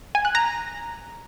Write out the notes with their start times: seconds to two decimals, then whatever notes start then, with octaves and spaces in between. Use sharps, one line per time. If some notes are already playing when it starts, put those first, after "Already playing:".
0.15 G#5
0.25 F#6
0.35 A#5